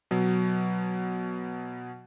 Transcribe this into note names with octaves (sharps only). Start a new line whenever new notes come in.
B2 F#3